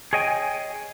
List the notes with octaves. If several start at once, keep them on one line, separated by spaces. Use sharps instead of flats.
G#4 C#5 D#5 G5 G#5